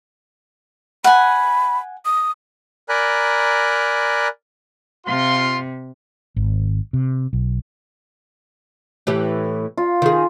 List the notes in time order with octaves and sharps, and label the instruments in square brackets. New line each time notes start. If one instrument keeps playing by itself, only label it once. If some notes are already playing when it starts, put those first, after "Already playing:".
[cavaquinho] F#5 G#5 [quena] B5
[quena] D#6
[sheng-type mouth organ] A#4 D5 G#5 A#5 B5 F#6
[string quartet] C3 [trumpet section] F4 C6
[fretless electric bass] G#1
C3
B1
[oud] A2 E3 G4
[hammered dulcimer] F4
[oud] D#3 G#4